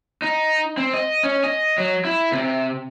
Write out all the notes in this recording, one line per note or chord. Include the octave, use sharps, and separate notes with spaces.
D#4
C4
D#5
C#4
D#5
F#3
E4
C3